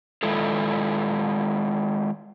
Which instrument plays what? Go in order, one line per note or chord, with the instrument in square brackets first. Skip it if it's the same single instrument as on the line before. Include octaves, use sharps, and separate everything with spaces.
[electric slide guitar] D#3 G#3 E4 F4 A4